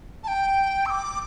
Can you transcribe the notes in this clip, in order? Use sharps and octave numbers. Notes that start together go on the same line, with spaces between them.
A5
G5
E6
D6